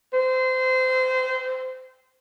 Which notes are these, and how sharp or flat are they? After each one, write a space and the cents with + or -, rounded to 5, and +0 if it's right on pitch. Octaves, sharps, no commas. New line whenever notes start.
C5 -25